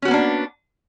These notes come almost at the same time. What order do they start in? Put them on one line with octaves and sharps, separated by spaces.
C#4 F#4 B3 A#3 D4